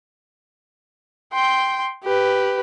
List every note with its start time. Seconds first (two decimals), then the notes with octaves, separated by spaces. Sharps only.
1.34 G5 C6
2.04 G4 B4